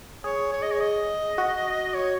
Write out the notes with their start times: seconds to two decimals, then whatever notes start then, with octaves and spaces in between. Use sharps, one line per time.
0.24 G#4 C#5
0.52 C#5
0.62 D#5
0.71 C#5
0.80 D#5
1.38 F#4
1.94 C#5